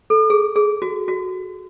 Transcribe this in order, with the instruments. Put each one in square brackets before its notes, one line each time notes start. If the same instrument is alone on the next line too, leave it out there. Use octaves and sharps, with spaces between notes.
[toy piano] A4
G#4
G#4
F#4
F#4